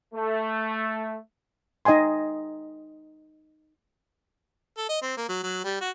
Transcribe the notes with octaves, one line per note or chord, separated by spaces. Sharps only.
A3
D#4 D#5 G5 G#5 C6
A4
D#5
C4
A#3
F#3
F#3
G3
F#4